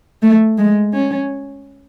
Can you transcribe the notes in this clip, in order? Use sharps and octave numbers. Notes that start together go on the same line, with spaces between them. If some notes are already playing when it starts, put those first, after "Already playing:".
A3
G#3
C#4